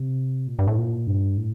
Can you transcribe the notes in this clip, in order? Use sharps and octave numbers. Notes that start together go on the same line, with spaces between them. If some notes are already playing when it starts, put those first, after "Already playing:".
Already playing: C3
A#2
G2
A2
A#2
G2
A2